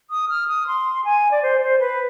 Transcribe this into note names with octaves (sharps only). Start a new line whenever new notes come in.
D#6
F6
D#6
C6
G#5
D5
C5
C5
B4